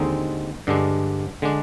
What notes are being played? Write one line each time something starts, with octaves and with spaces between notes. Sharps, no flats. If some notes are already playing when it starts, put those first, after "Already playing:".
Already playing: D#2 D3 G#3 C4 D#4
G2 D3 G#3 D4
D3 G#3 D4